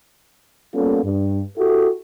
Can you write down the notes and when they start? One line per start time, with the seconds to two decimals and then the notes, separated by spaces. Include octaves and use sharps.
0.74 G3 A#3 B3 C#4 F4 A4
1.04 G2
1.57 E4 F#4 G4 A4